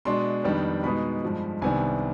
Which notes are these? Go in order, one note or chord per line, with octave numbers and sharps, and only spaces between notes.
B2 G#3 D4 C6
F2 D#3 G3 B3 D4
B2 G#3 B3 D#4 B5
G2 F3 G#3
C2 C3 D#3 B3 D4 G#5